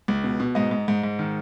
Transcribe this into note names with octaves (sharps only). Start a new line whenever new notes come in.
C#2
B2
B2
G#2 D#5
G#2
G#2
G#2
D#3